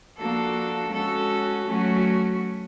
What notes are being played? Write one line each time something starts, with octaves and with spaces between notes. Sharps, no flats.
F3 A#3 D4 F#4 A4
G#3 C#4 F#4 A4
F#3 A3 C#4 F#4